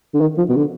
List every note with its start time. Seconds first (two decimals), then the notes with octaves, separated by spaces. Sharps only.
0.14 D3
0.21 D#3
0.38 F3
0.49 B2
0.56 D3